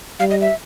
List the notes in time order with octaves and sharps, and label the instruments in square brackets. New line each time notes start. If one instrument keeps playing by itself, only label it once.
[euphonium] G3 [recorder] F5
[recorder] D#5
E5